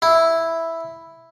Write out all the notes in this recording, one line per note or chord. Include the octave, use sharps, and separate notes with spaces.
E4